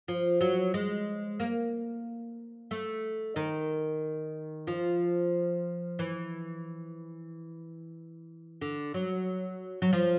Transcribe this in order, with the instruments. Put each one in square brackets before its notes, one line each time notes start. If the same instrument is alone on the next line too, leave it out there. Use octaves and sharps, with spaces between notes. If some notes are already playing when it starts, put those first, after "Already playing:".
[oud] F3
F#3
G#3
A#3
A3
D#3
F3
E3
D3
F#3
F#3
F3